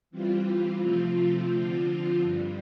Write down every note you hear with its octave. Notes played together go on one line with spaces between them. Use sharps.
E3 G3 C4 F4
C3 F3 A3 C4 F4
D3 F3 C4 F4
G2 D3 G3